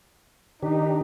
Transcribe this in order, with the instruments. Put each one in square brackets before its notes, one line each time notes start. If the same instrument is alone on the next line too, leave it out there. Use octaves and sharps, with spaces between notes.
[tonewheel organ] D#3 D4 G4 [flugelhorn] D#4